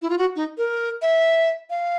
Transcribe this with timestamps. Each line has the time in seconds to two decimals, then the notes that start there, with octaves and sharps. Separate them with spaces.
0.02 E4
0.10 F4
0.19 F#4
0.36 D#4
0.58 A#4
1.02 E5
1.70 F5